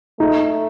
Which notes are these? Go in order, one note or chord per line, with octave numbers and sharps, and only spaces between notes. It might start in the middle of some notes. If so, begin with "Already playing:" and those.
A3 D#4